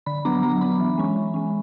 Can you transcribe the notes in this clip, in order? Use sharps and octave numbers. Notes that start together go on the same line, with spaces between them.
D3 B5
F#3 B3 D4 A#5
F#3 A#5
B3 D4 B5
E3
G#3 C#4
E3
G#3 C#4